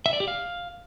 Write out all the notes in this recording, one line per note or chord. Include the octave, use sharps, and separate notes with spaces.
E5
D5
G4
F5